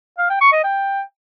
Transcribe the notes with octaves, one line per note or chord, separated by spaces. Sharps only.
F5
G5
C#6
D#5
G5